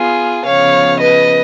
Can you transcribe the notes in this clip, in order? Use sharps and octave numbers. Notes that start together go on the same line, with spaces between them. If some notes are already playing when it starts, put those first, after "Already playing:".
Already playing: B3 F4 G#4
C#3 F3 B3 C#5 F5
B4 D#5